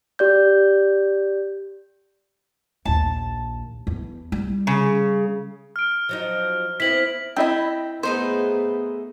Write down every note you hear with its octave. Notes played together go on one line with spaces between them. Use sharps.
G4 D5 G6
A#1 D#2 A5
E2
G3 E4
C#3
F6 D7
F3 F#3 D#4
B3 C4 E4 B6 F#7
C4 E4 D#5 G5 B5
A3 B3 D#4 G#4 C5